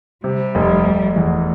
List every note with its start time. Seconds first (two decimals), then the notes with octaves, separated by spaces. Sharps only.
0.24 C3 G3
0.55 F1
0.86 F1
1.16 E2 A3